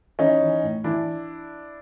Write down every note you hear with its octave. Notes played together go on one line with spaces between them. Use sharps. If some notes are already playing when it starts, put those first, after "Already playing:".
E3 C#4 D#4
E3
A2
E3 D4 E4